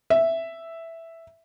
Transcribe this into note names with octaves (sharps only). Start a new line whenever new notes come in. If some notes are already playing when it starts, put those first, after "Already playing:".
E5